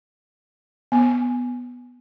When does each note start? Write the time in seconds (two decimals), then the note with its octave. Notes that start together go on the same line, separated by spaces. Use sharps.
0.92 B3